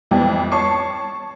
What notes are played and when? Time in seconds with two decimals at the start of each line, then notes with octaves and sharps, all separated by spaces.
0.11 B1 F2 E3 G3
0.52 C#5 A5 C#6 C7